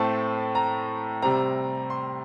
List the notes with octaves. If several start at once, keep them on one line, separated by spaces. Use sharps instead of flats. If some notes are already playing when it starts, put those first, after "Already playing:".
Already playing: A2 A3 C4 A5
A#5
C3 G3 C4 A#5
C6